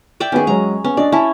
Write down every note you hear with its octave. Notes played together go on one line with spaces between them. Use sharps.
D5 E5 G5
D#3 B3 C#4 G#4
F#3 G#3 C#5 A#5
B3 C#4
D4 D5 D#5
C#4 E4 A5